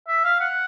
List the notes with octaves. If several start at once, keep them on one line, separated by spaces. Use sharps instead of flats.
E5
F5
F#5